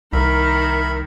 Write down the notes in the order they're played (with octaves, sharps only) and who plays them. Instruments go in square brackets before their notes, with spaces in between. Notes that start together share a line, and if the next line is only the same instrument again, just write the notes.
[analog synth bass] C2 [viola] D#3 [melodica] A#4 E5 B5